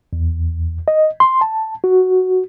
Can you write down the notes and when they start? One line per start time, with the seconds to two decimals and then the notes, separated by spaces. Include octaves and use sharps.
0.13 E2
0.88 D#5
1.20 C6
1.41 A5
1.84 F#4